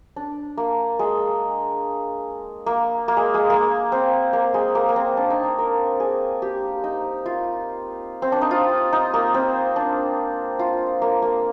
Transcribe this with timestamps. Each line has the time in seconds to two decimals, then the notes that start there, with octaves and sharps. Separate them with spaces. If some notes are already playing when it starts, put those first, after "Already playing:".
0.16 D4
0.57 A#3
0.99 G#3
2.66 A#3
3.08 A#3
3.17 G#3
3.34 G#3
3.50 A#3
3.92 C4
4.33 A#3
4.54 G#3
4.75 A#3
4.89 A#3
4.96 C4
5.17 D4
5.30 D#4
5.44 D4
5.58 A#4
6.00 G#4
6.42 G4
6.84 D#4
7.26 F4
8.22 C4
8.32 D4
8.41 D#4
8.51 F4
8.93 D#4
9.14 A#3
9.34 C4
9.76 D4
10.59 F4
11.02 A#3
11.22 A#3